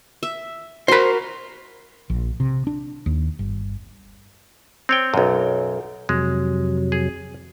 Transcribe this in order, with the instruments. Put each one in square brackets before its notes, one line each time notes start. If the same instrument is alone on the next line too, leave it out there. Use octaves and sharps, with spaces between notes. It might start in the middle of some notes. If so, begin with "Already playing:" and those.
[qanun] E5
[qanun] F#4 A#4 [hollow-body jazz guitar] C5 B5
[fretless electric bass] A#1
C3
D4
D#2
G1
[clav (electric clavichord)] C4 C#5 G5
B1 F#2
[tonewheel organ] F2 C3 F#3 [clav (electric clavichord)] G#3
[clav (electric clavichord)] G#4